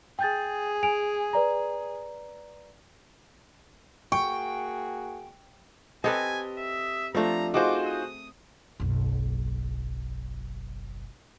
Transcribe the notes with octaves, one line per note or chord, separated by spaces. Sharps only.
G#4 G5 G6 A6
G#5 D7 F7
B4 D5 A#5
A#3 F#4 G#4 G5 C#6
C4 G4 A4 B4 D#5 G#5
E5
F3 A3 C4 D4 A#5
D#4 F4 F#4 G#4 C5 D6
D#6
F#1 B1